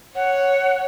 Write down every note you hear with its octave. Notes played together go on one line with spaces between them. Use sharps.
C#5 F#5